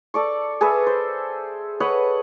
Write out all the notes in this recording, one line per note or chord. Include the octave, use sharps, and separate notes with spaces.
A4 D5 C#6
G#4 A4 B4 E5
C5
B4 C#5 D#5 F#5